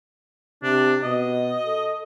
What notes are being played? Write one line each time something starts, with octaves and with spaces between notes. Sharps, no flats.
C3 D4
B2 D#5
A4